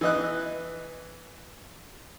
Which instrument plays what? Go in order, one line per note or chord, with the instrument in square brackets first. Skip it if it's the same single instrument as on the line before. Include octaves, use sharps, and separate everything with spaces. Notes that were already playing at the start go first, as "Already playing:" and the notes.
[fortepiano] E3 D#5 F#6